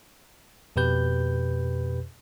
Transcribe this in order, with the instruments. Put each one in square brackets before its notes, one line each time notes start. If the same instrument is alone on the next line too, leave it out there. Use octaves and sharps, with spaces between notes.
[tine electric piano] F2 B2 G4 B4 G6